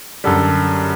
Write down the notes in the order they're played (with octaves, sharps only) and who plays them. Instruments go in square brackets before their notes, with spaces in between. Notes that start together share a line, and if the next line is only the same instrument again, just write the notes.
[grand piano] F#2 D3 G3 A4